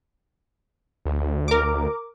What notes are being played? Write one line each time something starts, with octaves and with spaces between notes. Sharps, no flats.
D2
A#4 D6